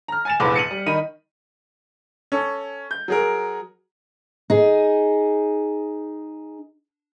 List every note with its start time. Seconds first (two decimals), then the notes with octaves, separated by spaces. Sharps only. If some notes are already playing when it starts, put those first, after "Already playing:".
0.08 A#5 F6
0.25 G#5 A6 E7
0.40 F1 A#1 E2 B4 F5 D6
0.56 C#7 D#7 F#7
0.71 G3
0.86 D#3 D#4 D#5 B5 D#7
2.32 C#4 A4
2.91 G6
3.08 F#3 G#4 A#4
4.50 D#4 G#4